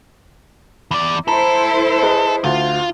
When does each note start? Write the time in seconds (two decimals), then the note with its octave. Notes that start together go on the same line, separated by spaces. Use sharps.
0.91 E2 D5
1.28 E4 A4 C5 A#5 B5
2.02 G#4 B4 D#5
2.44 D2 F4